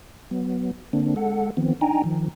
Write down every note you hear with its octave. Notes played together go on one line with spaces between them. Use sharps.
F#3 B3
D3 A#3 C4 D4
G#3 A4 F#5
D#3 F3 B3 C4
D4 D#4 G5 G#5 A#5
D#3 F3